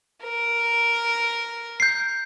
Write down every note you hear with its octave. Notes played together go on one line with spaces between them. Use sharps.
A#4
G6 C7